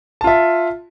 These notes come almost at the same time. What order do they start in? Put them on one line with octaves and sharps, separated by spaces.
A5 F4 E5